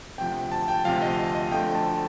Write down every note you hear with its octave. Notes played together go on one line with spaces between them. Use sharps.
D2 C3 F3 G5
A5
G5
D2 C3 F3 F5
D#5
D#5
D2 D3 F3 A3 G5
A5